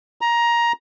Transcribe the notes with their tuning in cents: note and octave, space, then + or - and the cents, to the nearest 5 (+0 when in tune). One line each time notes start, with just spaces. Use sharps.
A#5 +15